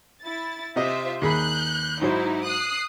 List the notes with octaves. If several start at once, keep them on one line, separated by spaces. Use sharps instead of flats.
E4 A6
C3 F4 C5 D#5 E5
D#2 G#4 B5 F#6 G6
G#2 F#3 D#4 E4 C5
D#6 F#6 C7